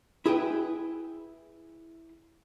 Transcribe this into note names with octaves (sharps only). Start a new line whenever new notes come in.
E4 G#4 B4 G5